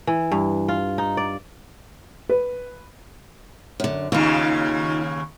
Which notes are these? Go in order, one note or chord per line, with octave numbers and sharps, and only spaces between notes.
E3
G2
F4
D#4
D5
B4
F#2 D3
D#2 C#3 D#4 F4